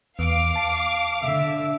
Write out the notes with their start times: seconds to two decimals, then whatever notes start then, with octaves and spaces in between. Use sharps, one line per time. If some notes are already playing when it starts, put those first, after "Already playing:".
0.19 E2 F5 D6
0.56 A5 C7
1.22 D3 E5